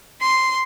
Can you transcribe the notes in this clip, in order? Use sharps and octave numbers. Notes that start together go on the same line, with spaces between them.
C6